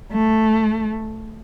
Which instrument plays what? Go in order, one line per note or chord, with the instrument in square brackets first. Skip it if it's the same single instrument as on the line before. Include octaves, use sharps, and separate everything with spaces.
[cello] A3